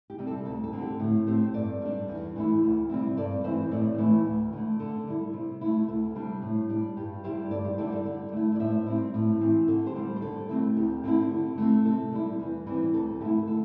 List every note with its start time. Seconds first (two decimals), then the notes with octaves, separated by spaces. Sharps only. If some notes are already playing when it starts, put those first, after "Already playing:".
0.10 G4
0.18 C3 G3
0.27 A4
0.45 D2 A4
0.64 A4
0.72 D3 C4
0.82 G4
1.00 A2
1.27 A3 C4 G4 C5
1.54 G2 A4 D5
1.81 G3 D4
2.08 E2
2.36 E3 A3 E4
2.63 D2
2.89 C3 G3 C4 E4
3.17 G2 A4 D5
3.44 E3 C4 E4 C5 E5
3.71 A2 A4 D5
3.98 E3 A3 E4
4.25 D2
4.53 D3 A3
4.79 D3 A4
5.07 G3 E4
5.33 C3
5.61 A3 E4
5.88 D2 A4
6.15 C3 G3 D4
6.42 A2
6.69 G3 D4
6.97 G2 G4
7.24 D3 G3 E4 G4 C5
7.51 G2 A4 D5
7.64 G4 C5
7.78 D3 G3 E4 A4 D5
7.92 A4 D5
8.05 D3 A4 D5
8.32 A3 E4
8.55 D5
8.59 A2 C5 E5
8.87 G3 C4 E4
9.14 A2
9.41 E3 C4
9.68 D3 A4
9.86 G4 C5
9.96 G3 D4
10.16 C5
10.22 D3 A4
10.49 A3 C4 E4
10.76 D2 G4
11.03 D3 C4 E4
11.31 D3
11.58 A3 C4
11.85 C3 A4
12.12 G3 E4
12.39 E2
12.66 E3 G3 C4
12.94 D2 A4
13.20 D3 A3 E4 G4
13.47 A4